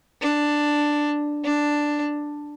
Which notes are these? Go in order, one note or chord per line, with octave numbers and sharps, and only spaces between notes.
D4
D4